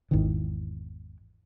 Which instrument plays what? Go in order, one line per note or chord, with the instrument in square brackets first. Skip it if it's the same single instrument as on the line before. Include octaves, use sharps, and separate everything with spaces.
[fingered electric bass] G#1 E2 D#3 E3